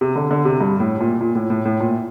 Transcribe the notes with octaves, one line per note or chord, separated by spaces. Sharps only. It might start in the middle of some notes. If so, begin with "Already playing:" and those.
C3
D3
D3
C3
G2
A2
A#2
A#2
A2
A2
A2
A#2